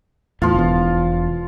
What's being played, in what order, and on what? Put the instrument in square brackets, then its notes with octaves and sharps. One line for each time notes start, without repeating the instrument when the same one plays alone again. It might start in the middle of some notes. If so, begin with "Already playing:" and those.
[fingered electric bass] E2 A2 [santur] F3 F4
[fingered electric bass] E1 E2